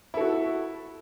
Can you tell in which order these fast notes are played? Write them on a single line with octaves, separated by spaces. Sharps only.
E4 A4 F#4